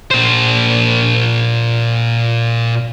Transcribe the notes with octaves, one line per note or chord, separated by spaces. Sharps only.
A#2 C5